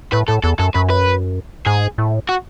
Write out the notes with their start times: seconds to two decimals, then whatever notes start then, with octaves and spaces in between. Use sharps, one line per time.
0.13 A2 B4
0.28 A2 A4
0.44 E2 A4
0.59 F#2 A4
0.74 F#2 B4
0.90 B4
1.66 G#2 G#4
1.98 A2
2.29 F#4